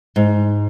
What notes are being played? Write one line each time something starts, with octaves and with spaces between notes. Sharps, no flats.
G#2